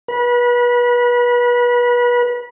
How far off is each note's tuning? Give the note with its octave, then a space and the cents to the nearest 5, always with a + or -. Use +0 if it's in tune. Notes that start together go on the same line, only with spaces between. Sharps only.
B4 -30